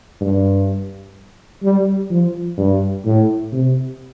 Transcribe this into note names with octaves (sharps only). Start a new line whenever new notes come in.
G2
G3
F3
G2
A2
C3